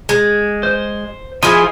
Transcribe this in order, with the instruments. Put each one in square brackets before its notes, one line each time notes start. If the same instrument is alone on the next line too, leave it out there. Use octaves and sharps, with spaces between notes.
[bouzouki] G#3
[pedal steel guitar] C5
[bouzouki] F3 E4 G#4 [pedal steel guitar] D#5 F5 C6